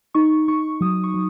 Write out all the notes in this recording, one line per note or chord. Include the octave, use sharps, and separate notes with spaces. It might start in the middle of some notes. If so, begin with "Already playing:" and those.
D#4 C#6
D#4 C#6
F#3 D#6
C#6
F#3